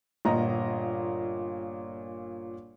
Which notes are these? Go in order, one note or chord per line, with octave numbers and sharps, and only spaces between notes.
G1 A#2 D#5 A#5